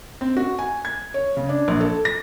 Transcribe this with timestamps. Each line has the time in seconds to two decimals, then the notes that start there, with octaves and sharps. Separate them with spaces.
0.21 C4
0.37 F#4
0.59 G#5
0.85 G#6
1.14 C#5
1.37 C#3
1.49 D4
1.68 A#1
1.80 A4
2.05 A#6